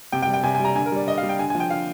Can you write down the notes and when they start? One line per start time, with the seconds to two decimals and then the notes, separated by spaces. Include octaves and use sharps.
0.12 C3 G5
0.22 G5
0.28 G3
0.34 G5
0.43 C3 G#5
0.55 G3 G#5
0.65 A#5
0.75 D3 G#5
0.86 A#4
0.92 G3 D5
1.07 D3 D#5
1.18 F5
1.23 G3
1.29 G5
1.39 D3 G#5
1.50 F3 G#5
1.60 G5
1.70 D3 F5